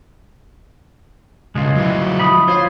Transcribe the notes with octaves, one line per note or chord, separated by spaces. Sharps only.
C#2 G#3 F4
F#3 E4
F3 B5 D#6
F4 C5 C#5 F5